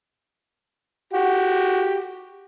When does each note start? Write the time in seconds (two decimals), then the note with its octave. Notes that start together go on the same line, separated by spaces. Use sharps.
1.13 F#4 G4